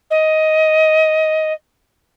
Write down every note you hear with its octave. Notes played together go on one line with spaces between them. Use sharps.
D#5